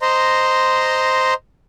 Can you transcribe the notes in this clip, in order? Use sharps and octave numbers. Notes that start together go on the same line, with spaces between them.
C5 D#5 A#5 C6